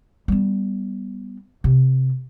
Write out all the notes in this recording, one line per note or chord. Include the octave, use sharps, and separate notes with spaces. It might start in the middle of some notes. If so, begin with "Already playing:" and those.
G3 B3
C3